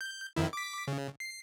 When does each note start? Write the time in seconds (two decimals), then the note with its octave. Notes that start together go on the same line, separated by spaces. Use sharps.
0.01 G6
0.36 F2 D#3 E4
0.53 D6 B6
0.88 C#3
1.20 C7